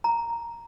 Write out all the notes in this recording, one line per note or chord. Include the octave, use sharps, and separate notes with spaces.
A#5